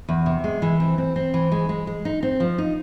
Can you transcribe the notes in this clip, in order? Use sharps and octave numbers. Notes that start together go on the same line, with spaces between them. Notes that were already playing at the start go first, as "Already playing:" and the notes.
E2
C3
G#3
E3
C4
C4
C4
E3
G#3
G#3
G#3
D#4
C4
F3
D#4